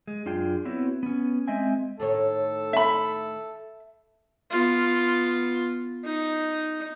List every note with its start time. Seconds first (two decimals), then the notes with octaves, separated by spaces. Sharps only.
0.07 G#3
0.26 F#2 D4 F4 G#4 G5
0.65 B3 C4 E4 F#4 C#5
1.03 B3 C#4
1.48 G#3 C4 D#5 E5 G#5
2.00 A2 D#3 A4 C#5
2.73 E5 B5
4.51 B3 F4
6.04 D#4